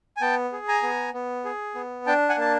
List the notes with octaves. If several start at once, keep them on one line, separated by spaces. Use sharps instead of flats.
G#5
B3 G5 A5
G#4
G#5 A#5
B3
B3
G#4
B3
D4 G5 A5
F#5 G#5
A#3 A5